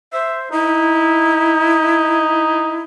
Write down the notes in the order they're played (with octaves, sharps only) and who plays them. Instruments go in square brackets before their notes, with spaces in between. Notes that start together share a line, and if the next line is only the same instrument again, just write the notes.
[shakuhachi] C5 [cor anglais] E5
[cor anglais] D#4 [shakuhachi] E4